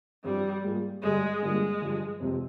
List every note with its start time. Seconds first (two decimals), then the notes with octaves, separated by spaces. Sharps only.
0.24 G2 F3 G3 C4
0.63 G#2 G3 A#3 F4 G#4
1.02 G2 D3 G3 G#3
1.42 G2 D3 G3 G#3 A#3 F4
1.81 G2 D3 F3
2.20 F2 C3 F3 G#3 C4